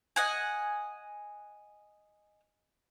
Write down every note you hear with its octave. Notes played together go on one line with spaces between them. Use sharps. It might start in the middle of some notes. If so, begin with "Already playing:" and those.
D#5 F#5 G#5